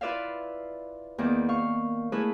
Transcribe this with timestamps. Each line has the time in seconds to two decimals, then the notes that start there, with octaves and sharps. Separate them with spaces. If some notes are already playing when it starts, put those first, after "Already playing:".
0.01 E4 F4 B4 D5 E5 F5
1.18 E2 D#3 A#3 D5
1.49 F5 C#6
2.12 A3 A#3 E4 G#4 B4